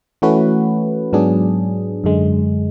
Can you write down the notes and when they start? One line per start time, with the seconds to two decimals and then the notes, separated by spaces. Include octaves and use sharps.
0.22 E3 A3 C#4 F#4 B4
1.13 G#2 F#3 B3 D4 G#4
2.04 F#2 D3 G#3